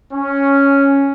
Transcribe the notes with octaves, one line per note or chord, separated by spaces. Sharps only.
C#4